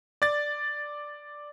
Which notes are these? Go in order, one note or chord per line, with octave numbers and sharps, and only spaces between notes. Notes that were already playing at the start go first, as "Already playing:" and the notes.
D5 A6